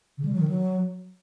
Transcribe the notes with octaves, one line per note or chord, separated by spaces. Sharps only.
C#3
G3
F#3
D#3
F#3